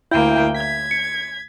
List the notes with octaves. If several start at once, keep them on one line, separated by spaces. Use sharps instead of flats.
D2 A#3 E4 E5 G5 G6
G#6 B6
C#7